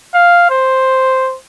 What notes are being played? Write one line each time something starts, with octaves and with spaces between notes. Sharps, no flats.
F5
C5